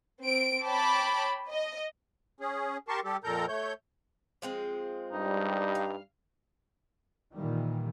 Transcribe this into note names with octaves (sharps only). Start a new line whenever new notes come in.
C4 D7
C#5 G5 A5 B5 D6
D#5
C#4 G#4
G4 A#4 A5 C6 C#6
G3 G4 A4
F2 A#2 A4 A#4 A#5 G6
A3 C#5 G6
F3 G#3 C4
G2 G3 D#4
F5
A#2 D#3 E3 G3